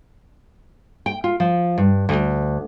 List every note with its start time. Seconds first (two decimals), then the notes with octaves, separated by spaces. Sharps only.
1.06 G5
1.24 F4
1.40 F3
1.78 G2
2.09 D2